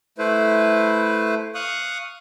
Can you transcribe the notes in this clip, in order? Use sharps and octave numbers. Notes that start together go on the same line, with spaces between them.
A3 E4 B4 C5
F5 C#6 D#6 F#6